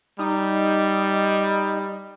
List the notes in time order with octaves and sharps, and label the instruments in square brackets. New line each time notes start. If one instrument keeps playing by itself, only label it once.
[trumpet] G3 [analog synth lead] D#4